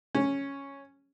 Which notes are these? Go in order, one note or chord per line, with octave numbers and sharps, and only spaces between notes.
C#4